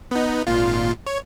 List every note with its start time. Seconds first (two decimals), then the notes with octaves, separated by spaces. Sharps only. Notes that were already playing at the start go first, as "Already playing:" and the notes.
0.11 B3 D#4
0.47 G#1 A#2 F4
1.07 C#5